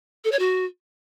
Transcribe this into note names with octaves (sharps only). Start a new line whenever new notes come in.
A4
C#5
F#4